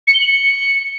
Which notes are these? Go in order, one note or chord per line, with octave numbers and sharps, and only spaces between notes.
C#7
G7
F#7
C#7